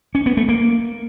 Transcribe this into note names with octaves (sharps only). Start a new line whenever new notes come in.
C#4
B3
A3
A#3